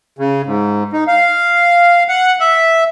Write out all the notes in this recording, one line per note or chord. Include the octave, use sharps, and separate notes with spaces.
C#3
G#2
D#4
F5
F#5
E5